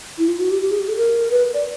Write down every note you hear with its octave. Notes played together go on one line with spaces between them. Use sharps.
E4
F4
F#4
G4
G4
G#4
G4
A4
A#4
B4
D5